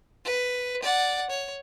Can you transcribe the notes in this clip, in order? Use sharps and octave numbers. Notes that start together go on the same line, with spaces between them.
B4
D5 F#5
C#5